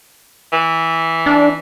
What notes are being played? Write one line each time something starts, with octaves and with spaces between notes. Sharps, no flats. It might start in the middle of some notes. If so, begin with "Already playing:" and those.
E3
D4